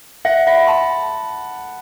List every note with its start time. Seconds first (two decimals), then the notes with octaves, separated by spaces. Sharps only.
0.25 E5 F#5
0.47 E5 B5
0.67 A5 C6